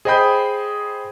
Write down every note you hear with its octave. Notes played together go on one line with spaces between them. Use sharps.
G#4 C5 D#5 G5 B5 G6